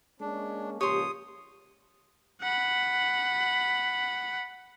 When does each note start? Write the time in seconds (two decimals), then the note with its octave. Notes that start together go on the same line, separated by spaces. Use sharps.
0.20 G#3 A#3 C#4 D4
0.81 C#2 A#2 F3 G4 C#5 C6 D#6
2.41 F#5 B5